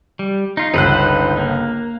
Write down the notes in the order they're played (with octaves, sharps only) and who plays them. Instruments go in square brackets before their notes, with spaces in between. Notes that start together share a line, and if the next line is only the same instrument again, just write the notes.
[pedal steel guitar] G3
D#4 F4
[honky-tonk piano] G1 C#2 F#6 [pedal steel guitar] D#4 B4 C5
[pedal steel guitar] A#3